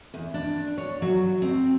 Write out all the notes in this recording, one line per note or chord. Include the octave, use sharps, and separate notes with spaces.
E2
D4
C#5
F#3
C4